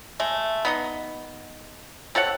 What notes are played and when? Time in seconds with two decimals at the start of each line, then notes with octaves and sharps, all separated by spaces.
0.20 G#3 A3
0.65 B3 D#4 D#5
2.15 C4 A4 C#5 F#5